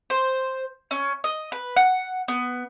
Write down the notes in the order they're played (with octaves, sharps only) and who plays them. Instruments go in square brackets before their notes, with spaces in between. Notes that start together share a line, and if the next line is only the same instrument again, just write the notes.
[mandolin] C5
C#4
D#5
B4
F#5
B3